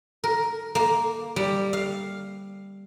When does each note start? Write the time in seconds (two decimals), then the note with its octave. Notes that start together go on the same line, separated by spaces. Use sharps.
0.24 A#4
0.75 A#3
1.36 G3
1.73 F5